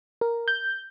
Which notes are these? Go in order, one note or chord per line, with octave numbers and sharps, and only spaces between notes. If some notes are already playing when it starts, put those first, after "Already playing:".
A#4
G6